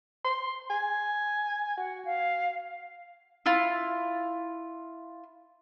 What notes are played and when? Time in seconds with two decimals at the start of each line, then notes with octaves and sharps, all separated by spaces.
0.25 C6
0.70 G#5
1.78 F#4 F#5
2.05 F5
3.46 E4 F4